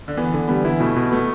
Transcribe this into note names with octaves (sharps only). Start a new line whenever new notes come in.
D3
E3 B3
D3
G3 B3
E3 E4
B2 A3
B2
A3 B3